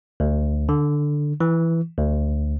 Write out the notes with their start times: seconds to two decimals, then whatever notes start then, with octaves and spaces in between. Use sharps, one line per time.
0.20 D2
0.69 D3
1.41 E3
1.98 D2